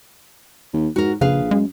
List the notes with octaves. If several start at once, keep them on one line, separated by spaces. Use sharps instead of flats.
D#2
G#2 F#4 A#4
A#1 C#3 G#4 B4 F5
F#2 G#3